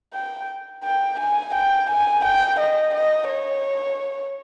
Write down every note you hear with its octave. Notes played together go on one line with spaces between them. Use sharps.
G5
G5
G#5
G5
G#5
G5
D#5
D#5
C#5